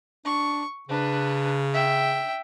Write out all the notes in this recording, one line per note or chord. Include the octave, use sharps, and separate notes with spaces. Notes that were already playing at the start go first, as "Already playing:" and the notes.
D4 C#6
C#3 D4 B4
E5 G5